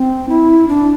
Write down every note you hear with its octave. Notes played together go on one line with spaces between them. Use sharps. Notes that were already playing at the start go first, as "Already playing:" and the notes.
Already playing: C4
E4
D4